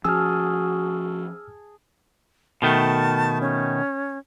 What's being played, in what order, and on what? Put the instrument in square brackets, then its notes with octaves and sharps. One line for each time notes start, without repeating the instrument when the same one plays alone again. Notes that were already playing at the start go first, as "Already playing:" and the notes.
[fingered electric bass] F3 C#4 [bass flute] F#4 [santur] G#4 A5 [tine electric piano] E6 F6
[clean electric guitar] B2 D#3 A3 [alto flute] A5
[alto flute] C#4